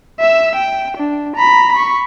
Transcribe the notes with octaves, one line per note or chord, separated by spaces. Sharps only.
E5 E6
G5
D4
A#5 B5
B5 C#6